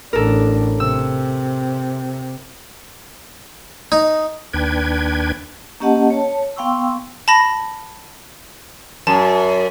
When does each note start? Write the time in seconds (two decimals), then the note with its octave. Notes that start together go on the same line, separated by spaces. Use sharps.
0.13 A1 D4 A4 A#4
0.80 C3 E6
3.92 D#4
4.54 D#2 D4 B4 G5 G#6
5.80 A#3 C#4 G4 D#5 F#5 A5
6.10 C#5 A5
6.56 B3 F5 G5 C6 C#6 E6
7.28 A5 B5 A#6
9.07 F#2 A5